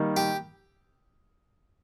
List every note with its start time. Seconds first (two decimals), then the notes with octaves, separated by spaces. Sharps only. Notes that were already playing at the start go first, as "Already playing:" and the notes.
Already playing: D#3 G3 A#3 D#4
0.17 G4